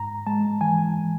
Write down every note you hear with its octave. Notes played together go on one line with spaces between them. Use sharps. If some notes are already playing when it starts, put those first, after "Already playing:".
Already playing: G#2 A#5
G#3 A5
E3 G#5